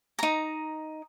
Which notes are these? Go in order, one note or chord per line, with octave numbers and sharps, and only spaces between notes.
D#4 A#5